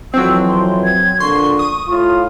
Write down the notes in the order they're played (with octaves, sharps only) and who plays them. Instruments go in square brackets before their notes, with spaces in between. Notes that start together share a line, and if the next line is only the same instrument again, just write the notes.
[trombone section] F2 E3 [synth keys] F#3 C4 [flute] E6
[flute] C6
G#6
[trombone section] A#1 A#2 D3 [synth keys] C6 [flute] C#6
[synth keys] D#6
[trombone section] A2 F4